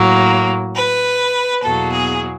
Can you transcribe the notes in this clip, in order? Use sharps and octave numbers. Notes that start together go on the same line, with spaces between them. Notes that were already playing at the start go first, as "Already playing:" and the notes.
Already playing: A2 F#3 A#3
B4
E2 B2 F#3 A#3 A4
G#4